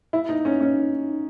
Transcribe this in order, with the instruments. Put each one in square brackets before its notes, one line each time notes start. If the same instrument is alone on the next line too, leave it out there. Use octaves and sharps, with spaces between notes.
[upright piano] E4
D#4
C#4
C#4